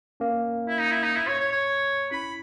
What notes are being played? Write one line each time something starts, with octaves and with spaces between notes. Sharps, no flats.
A#3 C#4
E4
D#4
E4
D#4
E4
C#5
C#5
C#5
C#4 E4 B5